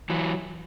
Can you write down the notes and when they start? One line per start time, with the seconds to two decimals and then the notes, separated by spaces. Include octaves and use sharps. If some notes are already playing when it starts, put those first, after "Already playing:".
0.10 E3 F#3